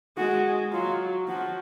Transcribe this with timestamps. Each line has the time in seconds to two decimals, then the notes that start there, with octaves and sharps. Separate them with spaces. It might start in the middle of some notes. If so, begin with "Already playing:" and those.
0.18 G#3 F#4
0.72 F#3 F4
1.28 F3 F#4